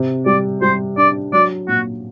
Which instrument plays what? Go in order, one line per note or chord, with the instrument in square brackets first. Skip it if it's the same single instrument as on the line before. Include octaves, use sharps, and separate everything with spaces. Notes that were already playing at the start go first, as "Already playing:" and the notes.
Already playing: [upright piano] C3
[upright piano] G3 [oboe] D5
[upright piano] G3 [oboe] C5
[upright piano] D4 [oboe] D5
[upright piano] F#3 [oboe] D5
[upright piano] A#2 [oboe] F#4